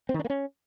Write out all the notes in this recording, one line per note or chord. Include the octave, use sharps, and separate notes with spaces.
C4
D#3
D4
A#3
C#4